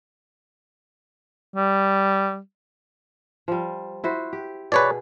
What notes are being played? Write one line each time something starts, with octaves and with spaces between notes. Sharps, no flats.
G3
F3 G3
E4 F#4 C5
G4
B2 G#4 B4 C#5 D5